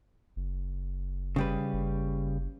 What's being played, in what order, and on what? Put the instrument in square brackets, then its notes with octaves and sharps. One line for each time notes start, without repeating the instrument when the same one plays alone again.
[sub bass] F#1
[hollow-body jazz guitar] C#3 G3 B4
[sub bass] F#1